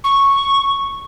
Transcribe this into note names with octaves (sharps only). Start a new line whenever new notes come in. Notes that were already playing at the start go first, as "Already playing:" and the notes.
C#6